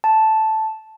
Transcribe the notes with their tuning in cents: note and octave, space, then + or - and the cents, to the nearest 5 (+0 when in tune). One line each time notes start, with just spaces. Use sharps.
A5 -5